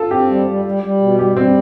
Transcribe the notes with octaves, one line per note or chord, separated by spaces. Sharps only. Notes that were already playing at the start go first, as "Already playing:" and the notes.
Already playing: F4 A4
C4 G4
G3
G3
G3
G3
B2
G3 G4
G3 C4